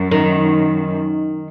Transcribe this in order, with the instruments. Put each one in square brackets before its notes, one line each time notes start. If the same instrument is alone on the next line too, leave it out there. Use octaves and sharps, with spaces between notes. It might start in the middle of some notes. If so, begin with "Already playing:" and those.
Already playing: [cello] F#2
[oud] D#3